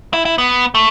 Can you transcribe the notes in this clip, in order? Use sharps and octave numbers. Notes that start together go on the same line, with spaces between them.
E4
E4
B3
A3